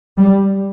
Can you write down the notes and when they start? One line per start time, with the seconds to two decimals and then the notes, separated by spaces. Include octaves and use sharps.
0.17 G3